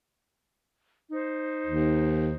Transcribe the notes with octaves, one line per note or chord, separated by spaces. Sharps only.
D#4 C5
D#2